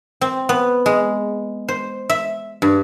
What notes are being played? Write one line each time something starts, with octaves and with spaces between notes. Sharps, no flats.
C4
B3
G#3
C5
E5
G2